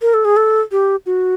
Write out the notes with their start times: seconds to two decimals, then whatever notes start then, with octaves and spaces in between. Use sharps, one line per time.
0.02 A#4
0.14 A4
0.25 G#4
0.37 A4
0.72 G4
1.06 F#4